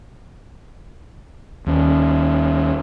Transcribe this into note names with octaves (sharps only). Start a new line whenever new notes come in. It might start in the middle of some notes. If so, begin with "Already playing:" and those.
D#2 C#4